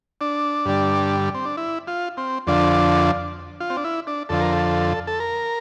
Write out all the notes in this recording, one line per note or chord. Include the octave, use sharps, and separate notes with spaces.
D4
G2 D3 G3
C4
D4
E4
F4
C4
F2 D3 F3 D4
F4
C4
D4
E4
D4
F2 D3 F3 A4
A#4
A4
A4
A#4